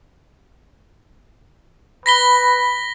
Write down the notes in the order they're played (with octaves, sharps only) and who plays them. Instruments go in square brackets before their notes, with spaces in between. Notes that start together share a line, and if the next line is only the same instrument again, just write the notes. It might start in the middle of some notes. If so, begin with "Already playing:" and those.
[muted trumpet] B4 [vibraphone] B5 [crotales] A#6 B6 G7